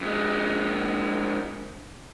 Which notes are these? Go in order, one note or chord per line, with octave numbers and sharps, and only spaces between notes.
F2 G#3